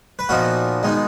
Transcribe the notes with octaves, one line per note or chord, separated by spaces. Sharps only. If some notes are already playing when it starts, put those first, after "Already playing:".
B4
A#2 F3 B3 D#4 F#4 A#4
D#3 G#3 B3 D#4